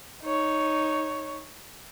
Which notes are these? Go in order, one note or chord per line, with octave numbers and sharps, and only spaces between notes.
D#4 C#5